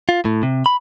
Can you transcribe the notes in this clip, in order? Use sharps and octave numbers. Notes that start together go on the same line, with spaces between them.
F4
A2
C3
B5